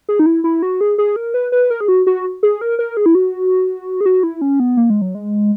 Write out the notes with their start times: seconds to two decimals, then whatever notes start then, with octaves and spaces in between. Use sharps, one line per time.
0.09 G#4
0.19 D#4
0.26 E4
0.44 E4
0.62 F#4
0.81 G#4
0.98 G#4
1.16 A#4
1.34 B4
1.52 B4
1.70 A#4
1.81 G#4
1.88 F#4
2.07 F#4
2.43 G#4
2.61 A#4
2.79 A#4
2.97 G#4
3.06 E4
3.15 F#4
4.01 G#4
4.06 F#4
4.23 E4
4.41 C#4
4.60 B3
4.77 A#3
4.90 G#3
5.02 F#3
5.15 G#3